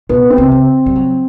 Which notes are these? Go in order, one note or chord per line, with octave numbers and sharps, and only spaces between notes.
B2 B3
C4
C3
C#3
G3
F#3